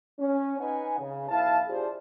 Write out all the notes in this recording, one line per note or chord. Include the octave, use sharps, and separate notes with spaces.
C#4
D#4 B4 F#5 G#5
C#3
B1 E4 E5 F5 A5
D4 F4 G4 G#4 C5 D5